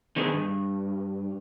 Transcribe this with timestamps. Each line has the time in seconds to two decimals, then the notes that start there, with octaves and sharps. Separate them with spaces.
0.16 D3 D#3 B3 G#4
0.33 G2